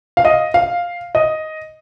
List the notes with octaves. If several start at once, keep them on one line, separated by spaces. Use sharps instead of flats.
F5
D#5
F5
D#5